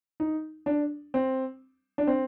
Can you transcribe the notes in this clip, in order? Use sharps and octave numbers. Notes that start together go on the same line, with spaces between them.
D#4
D4
C4
D4
C4